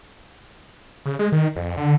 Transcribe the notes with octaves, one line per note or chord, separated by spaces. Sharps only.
C#3
G#3
D#3
F2
D3